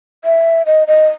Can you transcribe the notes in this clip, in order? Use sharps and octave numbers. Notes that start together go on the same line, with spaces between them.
E5
D#5
D#5